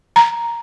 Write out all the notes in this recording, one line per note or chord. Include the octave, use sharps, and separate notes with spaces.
A#5